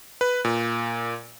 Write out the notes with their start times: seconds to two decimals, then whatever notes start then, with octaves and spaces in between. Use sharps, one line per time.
0.21 B4
0.45 A#2